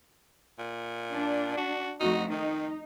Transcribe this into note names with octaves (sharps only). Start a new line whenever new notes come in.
A#2
D4
F#4
F2 A3 D#4 F#4
D#3 D#4